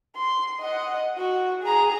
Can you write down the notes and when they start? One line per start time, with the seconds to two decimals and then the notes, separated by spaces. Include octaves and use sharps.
0.16 C6
0.60 D#5 F#5
1.18 F#4
1.63 G#4 A#5